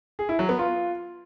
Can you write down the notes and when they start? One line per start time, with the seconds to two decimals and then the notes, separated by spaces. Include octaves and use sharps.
0.19 G#4
0.29 E4
0.39 F#3
0.49 B3
0.59 F4